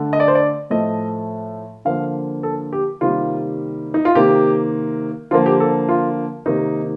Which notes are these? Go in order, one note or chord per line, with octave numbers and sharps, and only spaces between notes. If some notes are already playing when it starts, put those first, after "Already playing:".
Already playing: D3 A3
D#5
D5
C5
D5
A2 F3 A3 D#5
D3 F3 A#3 F5
A4
G4
C3 D#3 G3 A#3 F4
D#4
F4
C3 D#3 A#3 G4
D3 F3 A#3 F4
G4
A4
F4
C3 D#3 A#3 D#4